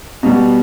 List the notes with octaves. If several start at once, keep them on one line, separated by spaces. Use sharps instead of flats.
B2 G3 B3